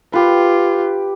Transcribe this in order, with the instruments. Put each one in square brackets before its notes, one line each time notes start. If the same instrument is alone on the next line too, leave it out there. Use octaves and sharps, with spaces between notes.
[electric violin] F4 [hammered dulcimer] G4 B4